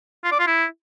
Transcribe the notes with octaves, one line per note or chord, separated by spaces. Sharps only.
F4
D5
F4
E4